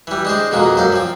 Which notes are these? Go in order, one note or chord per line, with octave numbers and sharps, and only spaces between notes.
E3 G3
G#3 D4 C5
F2 B2 G#3 A#3
F#2 C5 D5
F3 C4